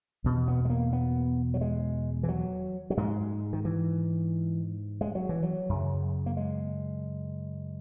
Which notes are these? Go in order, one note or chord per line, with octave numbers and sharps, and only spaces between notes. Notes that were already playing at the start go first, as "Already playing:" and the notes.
E2 B2
B3
G#3
A#3
B3
F#3
G#3
E3
F#3
F#3
G#2 G#3
D#3
E3
G#3
F#3
E3
F#3
F#2 C#3
A#3
G#3